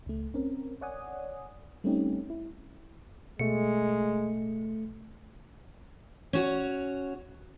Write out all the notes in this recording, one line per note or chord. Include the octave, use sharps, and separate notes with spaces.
C#2 A3
C4 C#4 A#4
C#5 D5 F#5 G#5 D#6
G3 A3 C4 C#4 D#4 G4
E4
B2 G#3 A3 C#7
C#4 F#4 C#5